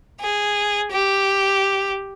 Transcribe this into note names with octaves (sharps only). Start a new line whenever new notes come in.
G#4
G4